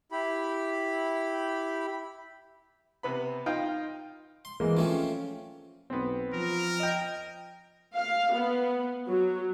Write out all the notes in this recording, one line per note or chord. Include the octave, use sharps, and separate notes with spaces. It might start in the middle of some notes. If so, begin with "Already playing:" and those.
E4 G4 B5
C3 B3 B5
D#4 F4 F5 G5
C6
E3 G#3 A#3
F3 A3 C4 C#4
B1 B3 C4
F3 A#4
D#5 G5
F5
B3
F#3